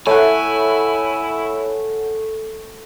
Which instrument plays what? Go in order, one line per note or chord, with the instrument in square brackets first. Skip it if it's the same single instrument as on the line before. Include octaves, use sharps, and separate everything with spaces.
[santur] A3 [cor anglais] E4 [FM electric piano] C#5 F#5 [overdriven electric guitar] G#5